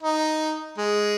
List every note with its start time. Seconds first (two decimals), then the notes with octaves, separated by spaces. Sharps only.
0.03 D#4
0.78 G#3